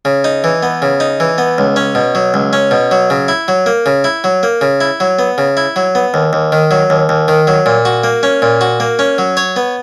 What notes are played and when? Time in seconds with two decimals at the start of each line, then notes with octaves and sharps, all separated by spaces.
0.05 C#3
0.24 D#4
0.44 E3
0.63 B3
0.82 C#3
1.00 D#4
1.20 E3
1.38 B3
1.58 C#2
1.76 C#4
1.95 B2
2.15 F#3
2.34 C#2
2.53 C#4
2.71 B2
2.91 F#3
3.10 C#3
3.28 E4
3.48 F#3
3.66 A#3
3.86 C#3
4.04 E4
4.24 F#3
4.43 A#3
4.61 C#3
4.81 E4
5.00 F#3
5.19 B3
5.38 C#3
5.57 E4
5.76 F#3
5.95 B3
6.14 D#2
6.33 D#2
6.52 D#3
6.71 F#3
6.90 D#2
7.09 D#2
7.28 D#3
7.47 F#3
7.66 A#2
7.85 F#4
8.04 A#3
8.23 C#4
8.42 A#2
8.61 F#4
8.80 A#3
8.99 C#4
9.18 F#3
9.37 C#5
9.56 B3